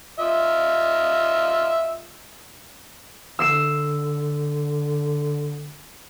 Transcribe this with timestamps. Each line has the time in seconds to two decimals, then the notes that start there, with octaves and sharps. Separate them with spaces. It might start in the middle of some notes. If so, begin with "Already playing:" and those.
0.19 F4 D#5 E5
3.39 D3 E6 C7 E7